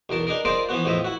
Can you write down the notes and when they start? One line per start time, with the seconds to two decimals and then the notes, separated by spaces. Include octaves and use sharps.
0.09 B1 E2 A#4 A5
0.27 D4 D#4 G#4 A#4
0.45 F4 G#4 A#4 C5 D5 D#5
0.69 E3 F3 B3 F#4
0.85 E2 A2 F3 D#5 E5
1.05 E4 F#4